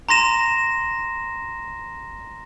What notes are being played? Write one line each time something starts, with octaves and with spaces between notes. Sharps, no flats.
A#5 C6 A#6 E7